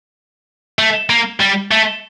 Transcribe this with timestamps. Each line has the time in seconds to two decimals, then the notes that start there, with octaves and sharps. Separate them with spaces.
0.79 A3
1.10 A#3
1.40 G3
1.71 A3